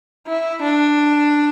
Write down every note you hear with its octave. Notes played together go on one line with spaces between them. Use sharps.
E4
D4